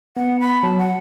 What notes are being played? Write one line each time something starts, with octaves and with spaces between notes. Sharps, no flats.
B3 F#5
B5
F#3 A5
F#5